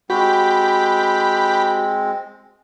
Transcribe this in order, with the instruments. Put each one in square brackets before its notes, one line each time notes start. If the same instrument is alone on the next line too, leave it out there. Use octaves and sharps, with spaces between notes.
[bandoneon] G#3 C4 [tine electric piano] F#4 [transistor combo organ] G4 B5